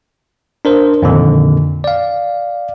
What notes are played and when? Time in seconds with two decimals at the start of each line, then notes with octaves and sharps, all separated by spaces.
0.65 D4 A#4 C5
1.02 F2 A#2 D3 D#3
1.84 D5 F5